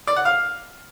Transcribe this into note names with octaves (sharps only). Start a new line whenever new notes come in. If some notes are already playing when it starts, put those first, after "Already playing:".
D5
F#5
F5